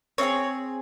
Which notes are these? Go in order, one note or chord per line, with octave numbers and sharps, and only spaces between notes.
C4 D#4 G#4 C#5